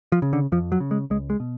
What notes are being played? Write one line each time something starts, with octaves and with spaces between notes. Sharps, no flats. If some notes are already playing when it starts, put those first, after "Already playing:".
F3
C#3
D3
F2 F3
F#3
C#3
G#3
C#2 G#3
G#3
B2